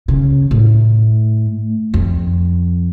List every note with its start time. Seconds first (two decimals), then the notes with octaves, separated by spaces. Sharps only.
0.08 C#3
0.51 A2
1.94 F2